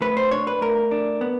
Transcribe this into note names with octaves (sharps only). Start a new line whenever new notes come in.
A3 B4
C5
D4 C#5
B4
A3 A#4
D4
B3